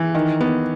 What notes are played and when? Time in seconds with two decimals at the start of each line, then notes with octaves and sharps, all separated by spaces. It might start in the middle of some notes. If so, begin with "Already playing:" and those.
Already playing: E3
0.15 D#3
0.41 B3